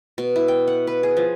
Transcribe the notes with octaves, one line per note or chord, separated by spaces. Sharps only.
B2
E4
G5
F#5
B4
G#4
F3